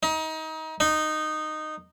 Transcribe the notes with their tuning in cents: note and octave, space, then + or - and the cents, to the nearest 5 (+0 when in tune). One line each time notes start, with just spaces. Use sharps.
D#4 +30
D#4 -10